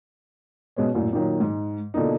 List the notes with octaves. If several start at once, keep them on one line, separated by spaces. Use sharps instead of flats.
B2 G#3 B3 C#4
A#1 F#2 A2
A#2 D#3 F#3
G#2
B2 D3 F3 A#3 D#4